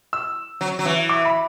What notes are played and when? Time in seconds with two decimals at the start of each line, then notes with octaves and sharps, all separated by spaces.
0.13 E6
0.61 F#3
0.79 F#3
0.85 E3
1.09 D6
1.25 B5